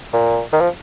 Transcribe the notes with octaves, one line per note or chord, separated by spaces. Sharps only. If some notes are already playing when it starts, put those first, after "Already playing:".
A#2
D#3
F3